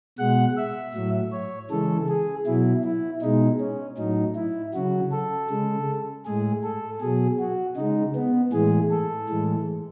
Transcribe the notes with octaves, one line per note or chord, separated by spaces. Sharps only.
B2 G#3 F#5
E5
A2 F#3
C#5
C#3 E3 G#3 A4
G#4
B2 F#3 E4
E4
B2 G#3 D#4
C#4
A2 F#3 D#4
E4
C#3 F#3 F#4
A4
C#3 G#3
A2 G#3 G#4
A4
B2 F#3 G#4
F#4
C#3 G#3 D#4
B3
A2 E3 G#3 G#4
A4
A2 E3 G#3